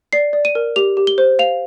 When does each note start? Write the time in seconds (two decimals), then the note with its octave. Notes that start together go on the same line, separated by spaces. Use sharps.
0.13 D5 C7
0.33 D5
0.45 D#7
0.55 A#4
0.76 G4 F7
0.97 G4
1.07 G7
1.18 C5
1.39 F5 F7